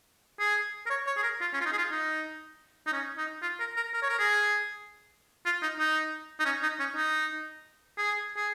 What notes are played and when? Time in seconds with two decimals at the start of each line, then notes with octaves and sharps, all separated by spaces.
0.39 G#4
0.86 A#4
0.90 C#5
1.07 C#5
1.17 G#4
1.23 A#4
1.41 F4
1.53 C#4
1.61 F4
1.66 D#4
1.73 G#4
1.78 F4
1.91 D#4
2.87 D#4
2.93 C#4
3.18 D#4
3.42 F4
3.60 A#4
3.76 A#4
3.94 A#4
4.02 C#5
4.10 A#4
4.19 G#4
5.46 F4
5.62 D#4
5.79 D#4
6.40 D#4
6.46 C#4
6.63 D#4
6.79 C#4
6.96 D#4
7.98 G#4
8.36 G#4